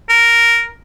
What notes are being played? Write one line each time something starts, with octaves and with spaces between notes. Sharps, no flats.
A#4